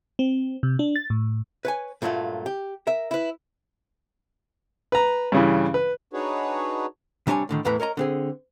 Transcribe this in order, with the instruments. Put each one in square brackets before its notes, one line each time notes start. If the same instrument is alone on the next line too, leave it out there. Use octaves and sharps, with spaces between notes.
[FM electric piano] C4
C3
D4
A6
A2
[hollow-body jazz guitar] B4 C#5 G#5
G2 A#2 F#3 A3 F4
G4
A#4 E5
E4 B4
[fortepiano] B4 A#5
G2 C#3 E3
B4
[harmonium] D4 D#4 F#4 G#4 B4 C#5
[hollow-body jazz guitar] C3 G3 D4 A#4 C#5 G#5
A2 D3 D#3
E2 A2 E3 E4 B4 A#5
A#4 C#5 D#5 A#5
D3 C4 G#4